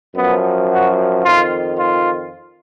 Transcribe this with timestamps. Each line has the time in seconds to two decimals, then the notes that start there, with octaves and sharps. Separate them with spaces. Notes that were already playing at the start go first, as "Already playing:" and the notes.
0.16 F#2 F3 B3
0.71 F#4
1.24 F2 D#3 F4
1.78 F4